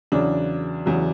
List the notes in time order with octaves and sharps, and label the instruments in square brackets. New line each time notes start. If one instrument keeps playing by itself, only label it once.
[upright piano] E2 C#3 F#3 D4
E2 C#3 F#3